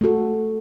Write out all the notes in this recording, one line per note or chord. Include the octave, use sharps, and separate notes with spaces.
A3 F#4 A4